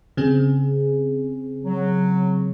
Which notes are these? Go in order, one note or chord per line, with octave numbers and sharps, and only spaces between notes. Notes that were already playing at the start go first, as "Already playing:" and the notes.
C#3 C4 G#4
F#3